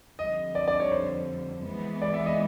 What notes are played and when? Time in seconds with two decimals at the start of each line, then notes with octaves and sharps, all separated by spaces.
0.19 F2 D3 G3 D#5
0.55 D5
0.68 D5
0.80 C#5
0.92 C5
1.65 E3 G#3 B3
2.02 D5
2.14 E5
2.26 D#5